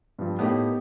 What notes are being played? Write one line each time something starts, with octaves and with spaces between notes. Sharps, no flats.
G2 F3
A2 A#3 B3 D#4 G4